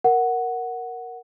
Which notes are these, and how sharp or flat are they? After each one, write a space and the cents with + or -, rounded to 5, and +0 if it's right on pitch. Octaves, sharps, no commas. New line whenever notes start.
A#4 +0 F#5 +0